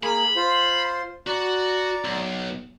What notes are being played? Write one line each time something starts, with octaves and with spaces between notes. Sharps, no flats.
A#3 G#4 G#5 B5
F4 C5 C6
F#4 D5 A#5
B1